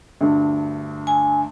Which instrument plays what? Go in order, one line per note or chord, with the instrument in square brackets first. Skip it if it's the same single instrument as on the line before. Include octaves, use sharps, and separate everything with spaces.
[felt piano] D2 G2
[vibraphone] G#5